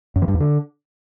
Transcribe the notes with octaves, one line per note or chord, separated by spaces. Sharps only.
F#2
E3
G2
E2
D3